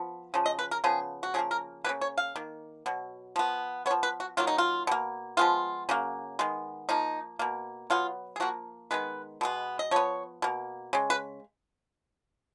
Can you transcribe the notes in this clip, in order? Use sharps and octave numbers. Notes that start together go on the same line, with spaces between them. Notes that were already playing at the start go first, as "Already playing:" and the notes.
Already playing: F3 B3
C#3 F3
D#5
B4
A#4
C#3 F3 B3 G#4
F#4
C#3 F3 A#3 G#4
A#4
C#3 F#3 A#3 B4
C#5
F5
D#3 A#3
B2 F#3
F3 B3
F3 B3 C#5
B4
F#4
D#3 F#3 A#3 F4
D#4
F4
B2 A#3
F3 G#3 B3 F4
C#3 F#3 A#3
D#3 G#3 B3
F3 A#3 D#4
B2 A#3
B2 F#3 B3 F4
G#4
F3 A#3 F#4
D#3 G#3 B3 B4
B2 G#3 B3
D#5
F3 B3 C#5
B2 A#3
C#3 G#3
B4